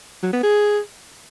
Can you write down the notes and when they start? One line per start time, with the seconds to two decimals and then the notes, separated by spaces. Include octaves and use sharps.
0.23 F#3
0.33 B3
0.43 G#4